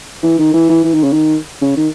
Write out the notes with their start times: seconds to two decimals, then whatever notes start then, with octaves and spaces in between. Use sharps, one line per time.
0.23 E3
0.39 D#3
0.53 E3
0.69 E3
0.84 E3
0.94 D#3
1.03 C#3
1.12 D#3
1.61 C#3
1.77 D#3